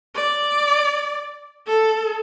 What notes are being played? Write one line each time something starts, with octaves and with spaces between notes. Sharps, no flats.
D5
A4